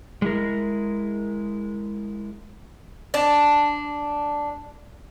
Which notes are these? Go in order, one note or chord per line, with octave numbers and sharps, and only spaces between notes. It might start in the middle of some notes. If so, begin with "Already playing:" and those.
G#3 E4 A#4
D4 A5